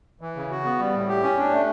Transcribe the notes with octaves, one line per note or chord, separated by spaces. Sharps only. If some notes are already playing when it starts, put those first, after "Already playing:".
E3
C#3
F#4
B3
G3
A2
G4
C#4
D4
A3